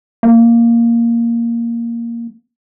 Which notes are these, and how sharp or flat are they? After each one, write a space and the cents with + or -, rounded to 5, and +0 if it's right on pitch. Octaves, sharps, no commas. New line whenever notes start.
A#3 +0